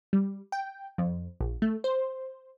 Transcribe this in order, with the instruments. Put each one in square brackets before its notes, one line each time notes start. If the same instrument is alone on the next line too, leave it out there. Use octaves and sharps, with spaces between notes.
[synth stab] G3
G5
F2
A#1
A3
C5